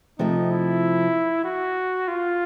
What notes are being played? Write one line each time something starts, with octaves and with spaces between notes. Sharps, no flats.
C3 F3 A3 C4 D#4
E4
F#4
F4